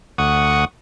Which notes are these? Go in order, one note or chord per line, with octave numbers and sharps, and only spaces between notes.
D2 F#5 C#6 D#6